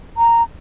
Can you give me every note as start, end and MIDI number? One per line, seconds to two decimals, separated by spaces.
0.17 0.43 82